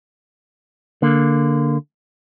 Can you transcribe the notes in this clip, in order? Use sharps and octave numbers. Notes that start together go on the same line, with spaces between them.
D3 A#3